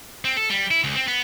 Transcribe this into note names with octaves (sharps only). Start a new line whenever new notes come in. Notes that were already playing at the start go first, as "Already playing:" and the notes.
C4
A4
G3
E4
C#2
C4
B3